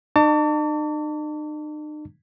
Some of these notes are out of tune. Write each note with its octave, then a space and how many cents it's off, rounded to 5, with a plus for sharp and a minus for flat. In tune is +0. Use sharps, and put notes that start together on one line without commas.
D#4 -45 A5 +35 D6 -40